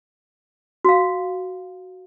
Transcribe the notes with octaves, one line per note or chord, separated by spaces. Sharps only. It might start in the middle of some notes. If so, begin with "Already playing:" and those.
F#4 F5